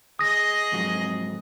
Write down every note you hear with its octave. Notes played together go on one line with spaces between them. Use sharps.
G#4 D#5 D#6 A#6
F2 G#2 F#3